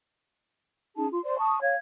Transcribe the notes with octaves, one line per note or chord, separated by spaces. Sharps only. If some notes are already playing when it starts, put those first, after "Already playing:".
C#4 D#4 G#4 A5
F4 C6
C5 D5 C6
A5 C#6 D#6
C#5 F5 G#6